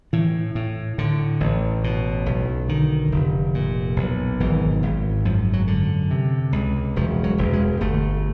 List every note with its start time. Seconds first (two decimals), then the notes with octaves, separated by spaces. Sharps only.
0.13 A2 E3
0.55 A2
0.98 A2 D3
1.40 A1
1.84 B2
2.26 B1
2.68 D3 D#3
3.12 F1
3.54 A#2
3.96 B1
4.40 G#1 E3
4.83 G#1
5.25 F#2 F3
5.53 F#3
5.67 D3
6.11 C3
6.53 C#2
6.96 E1 F3
7.24 F#3
7.38 E1
7.53 G#3
7.81 G1 A3